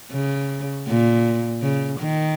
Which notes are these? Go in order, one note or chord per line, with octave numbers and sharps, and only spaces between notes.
C#3
A#2
C#3
D#3